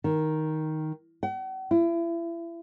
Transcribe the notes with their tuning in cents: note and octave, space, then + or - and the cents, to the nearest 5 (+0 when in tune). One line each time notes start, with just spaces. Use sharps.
D#3 +5
F#5 +45
E4 +35